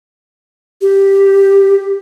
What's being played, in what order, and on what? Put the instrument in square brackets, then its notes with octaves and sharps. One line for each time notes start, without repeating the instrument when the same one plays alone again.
[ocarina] G4